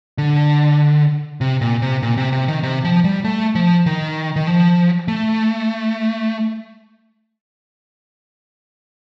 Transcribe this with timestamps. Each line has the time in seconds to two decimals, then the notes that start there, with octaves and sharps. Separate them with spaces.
0.18 D3
1.41 C3
1.61 A#2
1.82 C3
2.03 A#2
2.17 C3
2.33 C3
2.48 D#3
2.63 C3
2.84 F3
3.04 G3
3.24 A3
3.55 F3
3.86 D#3
4.36 D#3
4.47 F3
5.08 A3